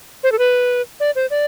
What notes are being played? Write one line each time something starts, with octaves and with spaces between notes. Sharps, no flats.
C5
A4
B4
D5
C5
D5